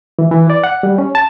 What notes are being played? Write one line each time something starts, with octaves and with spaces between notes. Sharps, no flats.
E3
E3
D5
F#5
G3
C#4
A5